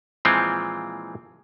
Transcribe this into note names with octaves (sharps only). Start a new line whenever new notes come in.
A#2 E3 F3 G#3 C4